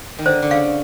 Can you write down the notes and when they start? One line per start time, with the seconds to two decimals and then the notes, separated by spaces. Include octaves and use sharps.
0.19 D#3
0.25 D3 C5
0.42 D3
0.51 C#3 F5